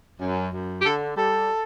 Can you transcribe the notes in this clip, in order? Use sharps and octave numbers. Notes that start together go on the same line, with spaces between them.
F#2
F#2
G4
D3 A4
G3 A4